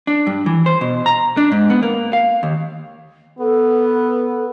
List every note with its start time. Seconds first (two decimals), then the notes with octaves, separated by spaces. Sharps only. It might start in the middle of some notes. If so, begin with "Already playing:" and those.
0.07 D4
0.27 G2
0.46 E3
0.66 C5
0.81 B2
1.06 A#5
1.37 D4
1.52 G#2
1.70 B3
1.83 A#3
2.13 F5
2.43 D#2
3.39 B3 A4